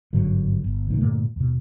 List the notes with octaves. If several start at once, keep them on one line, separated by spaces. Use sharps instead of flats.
G#1 G2 D3 F#3
G1
C#2 A#2 D#3
G2 A#2 D3 A3
D#2 B2